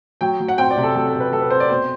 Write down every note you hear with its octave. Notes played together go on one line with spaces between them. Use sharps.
F#3 G5
F#3
F#5
C4 G5
D5
C3
A4
F#3 A4
A4
C3
B4
F#3 A4
B4
C4 C5
D5
B2 C5